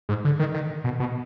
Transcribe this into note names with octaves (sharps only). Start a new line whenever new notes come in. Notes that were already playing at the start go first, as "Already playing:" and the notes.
G#2
D3
D#3
D#3
B2
B2